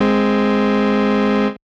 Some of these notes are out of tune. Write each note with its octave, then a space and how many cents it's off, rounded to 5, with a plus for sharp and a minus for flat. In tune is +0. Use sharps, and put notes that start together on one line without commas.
G#3 +0 C4 +0